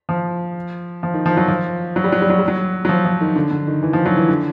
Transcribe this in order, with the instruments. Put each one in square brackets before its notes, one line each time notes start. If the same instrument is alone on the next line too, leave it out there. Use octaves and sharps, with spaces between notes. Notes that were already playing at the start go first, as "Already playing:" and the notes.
[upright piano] F3
F3
D#3
F3
F#3
F3
F#3
G3
F#3
G3
F#3
G3
F#3
F#3
F3
F3
D#3
D3
D3
D#3
E3
F3
F#3
E3
D3